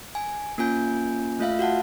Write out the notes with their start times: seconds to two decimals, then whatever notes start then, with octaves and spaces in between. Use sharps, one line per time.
0.15 G#5
0.58 A#3 C#4 F4 G#5 G6
1.39 A3 F4 E5 F5
1.59 F#4 F5 F#5 A5